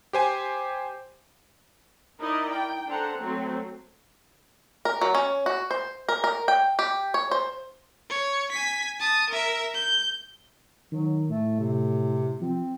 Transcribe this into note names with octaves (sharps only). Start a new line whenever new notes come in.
G4 C5 G#5
D#4 E4 A#4 D5 D#5
G5
D4 A4 C5 F#5 A#5
F#3 A3 C4
A#4
F#3
C#4
F#4
C5
A#4
A#4
G5
G4
C#5
C5
C#5
G#5 B6
A5 D#6
A#4 E5
G6
D#3 F#3
A2 A3
C3
F3 C4